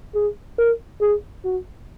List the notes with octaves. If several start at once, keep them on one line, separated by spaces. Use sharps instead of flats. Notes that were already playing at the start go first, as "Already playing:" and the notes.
G#4
A#4
G#4
F#4